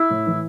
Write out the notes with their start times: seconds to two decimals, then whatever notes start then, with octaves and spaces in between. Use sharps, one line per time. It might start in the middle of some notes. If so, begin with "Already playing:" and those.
Already playing: E4
0.10 A2
0.27 E3